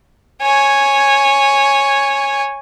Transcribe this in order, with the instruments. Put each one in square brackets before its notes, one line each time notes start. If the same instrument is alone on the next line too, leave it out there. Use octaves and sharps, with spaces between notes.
[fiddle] C#5 G#5